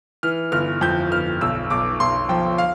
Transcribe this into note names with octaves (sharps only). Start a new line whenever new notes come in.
E3 F6
G1 F6
F2 G6
G1 F6
B1 E6
B1 D6
B1 C6
F3 G5
F5